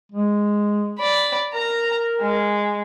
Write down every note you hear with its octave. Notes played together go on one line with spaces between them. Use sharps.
G#3
D5 B5
A#4 A#5
G#3